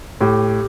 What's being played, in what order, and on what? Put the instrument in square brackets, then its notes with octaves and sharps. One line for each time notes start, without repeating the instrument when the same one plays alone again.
[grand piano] A2 [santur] G4